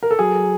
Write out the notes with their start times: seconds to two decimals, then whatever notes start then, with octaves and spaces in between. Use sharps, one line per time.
0.03 A#4
0.11 A4
0.19 F#3 G#4